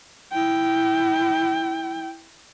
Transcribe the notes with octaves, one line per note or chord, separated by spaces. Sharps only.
E4 G5